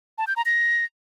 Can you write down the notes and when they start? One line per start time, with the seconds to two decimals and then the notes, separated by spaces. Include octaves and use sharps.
0.18 A5
0.27 G6
0.36 A#5
0.46 A#6